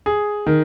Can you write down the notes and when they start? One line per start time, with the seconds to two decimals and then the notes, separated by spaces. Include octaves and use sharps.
0.06 G#4
0.46 D#3